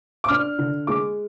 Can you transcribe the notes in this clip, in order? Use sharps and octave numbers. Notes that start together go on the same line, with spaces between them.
D6
D4 F6
D3
G#3 D6